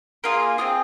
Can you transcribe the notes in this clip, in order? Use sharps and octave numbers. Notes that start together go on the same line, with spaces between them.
A#3 F4 G#4
C4 F4 G#4 D#5